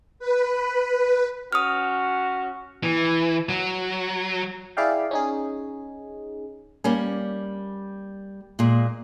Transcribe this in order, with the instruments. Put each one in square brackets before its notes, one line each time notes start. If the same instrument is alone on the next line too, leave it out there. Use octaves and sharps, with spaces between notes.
[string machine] B4
[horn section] C#4 F#4 [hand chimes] D#6 F6
[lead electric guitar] E3
F#3
[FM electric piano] E4 G#4 D5 E5 F5 G5
C#4 D#4 G#4
[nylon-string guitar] G3 A#3 C#4
A#2 G#3